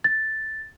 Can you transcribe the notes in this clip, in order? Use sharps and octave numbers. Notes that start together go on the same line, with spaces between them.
A6